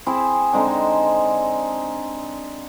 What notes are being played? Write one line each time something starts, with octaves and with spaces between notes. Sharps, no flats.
C4 E4 G#4
D3 G#3 C4 D#4